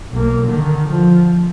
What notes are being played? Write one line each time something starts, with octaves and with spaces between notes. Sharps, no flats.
B1 A#3
D3 D#3
F3